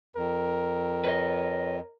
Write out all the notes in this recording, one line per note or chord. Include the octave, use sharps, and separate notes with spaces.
F2 A#4
B4 C#5 D#5